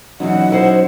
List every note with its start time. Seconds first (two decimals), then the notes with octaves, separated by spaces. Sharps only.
0.20 E2 E3 F#3 C#4 D#4 F#5
0.50 E4 B4 C5